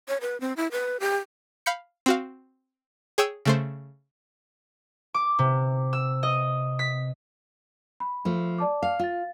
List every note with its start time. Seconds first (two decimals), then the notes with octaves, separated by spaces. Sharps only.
0.08 C#5
0.21 B4
0.40 C4
0.57 E4
0.72 B4
1.00 G4
1.66 F5 B5 G6 C#7
2.06 C4 F#4 F5
3.18 G#4 C#5 G5 D#6 E6
3.45 C#3 A3 C5
5.14 D6
5.39 C3
5.93 E6
6.23 D#5
6.79 B6
8.00 B5
8.25 F3 A3
8.58 D5 A5 D6
8.83 F5
8.99 F4 F5 A6